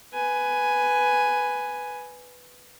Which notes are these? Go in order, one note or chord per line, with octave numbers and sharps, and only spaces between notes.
B4 G#5